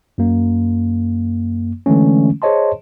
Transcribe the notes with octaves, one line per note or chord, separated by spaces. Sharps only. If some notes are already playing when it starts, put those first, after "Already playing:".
F#2 A#3
D3 E3 G#3 A3 C#4
G#4 C5 C#5 D#5 A5 C6